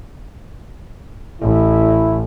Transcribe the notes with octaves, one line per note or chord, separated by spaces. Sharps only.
A1 E4